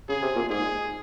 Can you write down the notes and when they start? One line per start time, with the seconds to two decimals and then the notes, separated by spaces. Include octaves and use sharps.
0.08 C#3 G#4
0.22 C3
0.36 A#2
0.49 G#2 G#4